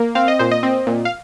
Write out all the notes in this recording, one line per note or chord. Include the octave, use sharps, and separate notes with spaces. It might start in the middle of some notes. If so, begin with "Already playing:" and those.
Already playing: A#3
C4 F5
D#5
A#2 C5
D#5
C4
A#2
F5